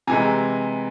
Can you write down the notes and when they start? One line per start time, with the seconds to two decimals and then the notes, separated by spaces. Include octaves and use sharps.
0.07 C3 E3 G#3 G#5 A#5